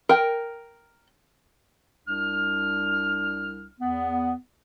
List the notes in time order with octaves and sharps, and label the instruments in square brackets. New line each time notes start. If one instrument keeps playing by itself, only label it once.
[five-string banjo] A#4 G5
[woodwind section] C2 D4 F6
E2 B3